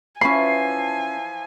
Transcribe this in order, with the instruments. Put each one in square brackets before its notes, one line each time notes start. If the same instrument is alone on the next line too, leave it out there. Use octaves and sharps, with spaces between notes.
[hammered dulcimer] E3 F3 E5 [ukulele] C#4 B5 [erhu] G#5 [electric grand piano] C7